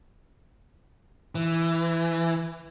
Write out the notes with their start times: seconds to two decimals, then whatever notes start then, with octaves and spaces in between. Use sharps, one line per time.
1.35 E3